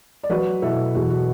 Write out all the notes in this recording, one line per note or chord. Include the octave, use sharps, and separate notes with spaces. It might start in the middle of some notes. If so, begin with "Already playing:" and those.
D5
F#3 F#4 B4
B2 E4 A4
E2 F#4
F#4